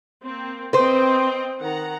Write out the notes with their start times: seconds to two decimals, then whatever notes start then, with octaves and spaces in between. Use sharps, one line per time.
0.23 A#3 C4
0.73 C4 B4 C5 D#5 G5
1.60 D#3 F#5 A#5